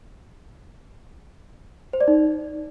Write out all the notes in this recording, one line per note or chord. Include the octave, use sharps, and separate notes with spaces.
C5
D5
D#4